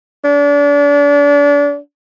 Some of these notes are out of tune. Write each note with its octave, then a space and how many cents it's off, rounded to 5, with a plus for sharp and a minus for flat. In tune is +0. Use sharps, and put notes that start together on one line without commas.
D4 -35